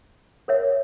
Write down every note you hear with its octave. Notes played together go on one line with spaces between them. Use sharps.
A#4 C#5 E5